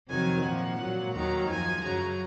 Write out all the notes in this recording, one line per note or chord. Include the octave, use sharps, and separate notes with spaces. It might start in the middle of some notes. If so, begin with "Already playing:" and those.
F2 C3 D#3 F#3 G#5
A#2 F3 F#5
A#2 F#3
D#2 D#3 F#3 A#5
F#2 F3 G#5
F#2 C#3 F#3 A#5